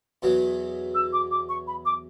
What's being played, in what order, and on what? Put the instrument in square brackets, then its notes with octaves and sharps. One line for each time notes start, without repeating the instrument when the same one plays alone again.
[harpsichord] E2 B2 F#3
[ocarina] E6
D6
D6
C#6
B5
D6